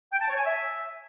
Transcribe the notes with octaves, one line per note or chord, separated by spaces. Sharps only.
G5
A5
C#5
G#5
E5